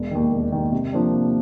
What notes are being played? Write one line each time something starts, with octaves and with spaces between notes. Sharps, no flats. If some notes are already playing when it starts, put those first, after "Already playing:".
Already playing: E1
D#2 D#3
E1
D#2 D#3
C3
F3 A#3 D4
C3